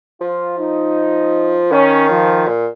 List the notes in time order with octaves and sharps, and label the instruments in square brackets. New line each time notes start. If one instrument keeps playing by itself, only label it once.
[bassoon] F3 [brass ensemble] F4
[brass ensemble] D#4
[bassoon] D#3 [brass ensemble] C#4
[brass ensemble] F3
[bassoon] A#2